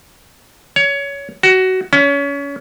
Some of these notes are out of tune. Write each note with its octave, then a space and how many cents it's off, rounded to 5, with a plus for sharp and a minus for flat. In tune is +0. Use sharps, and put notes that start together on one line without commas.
C#5 +20
F#4 +20
C#4 +30